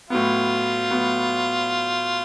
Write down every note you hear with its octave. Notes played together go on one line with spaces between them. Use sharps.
A2 F#3 B3 F4
A2 F#3 B3